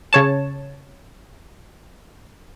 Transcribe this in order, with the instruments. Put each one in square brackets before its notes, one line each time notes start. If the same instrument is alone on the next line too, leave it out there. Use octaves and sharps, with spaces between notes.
[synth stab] C#3 C#5 A5